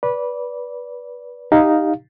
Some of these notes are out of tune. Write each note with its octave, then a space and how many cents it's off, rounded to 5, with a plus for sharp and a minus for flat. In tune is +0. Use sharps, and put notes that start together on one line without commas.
B4 -15 D5 -20
D#4 +0 G4 +0 F5 +0